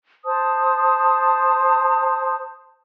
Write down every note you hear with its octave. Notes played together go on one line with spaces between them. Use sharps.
C5 A5 D#6